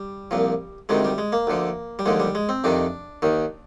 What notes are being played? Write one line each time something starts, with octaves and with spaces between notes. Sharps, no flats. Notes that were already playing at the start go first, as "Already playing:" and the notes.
Already playing: G3
C2 A#2 F3
D2 C3 D#3 G#3
G3
G#3
A#3
D2 D3 F3
G3
D#2 D3 F3 G#3
G3
G#3
C4
F2 C3 D#3 D4
D#2 D#3